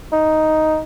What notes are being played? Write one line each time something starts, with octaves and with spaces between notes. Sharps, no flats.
D#4